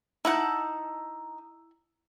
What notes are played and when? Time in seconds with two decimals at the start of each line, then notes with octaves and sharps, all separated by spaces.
0.25 D#4 E4 F#5 A5 G6